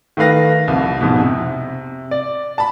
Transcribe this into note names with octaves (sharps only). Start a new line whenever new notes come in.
D#3 A3 B4 F5 A#6
C2 F2
F2 G#2 B2
C3
D5
A5 B5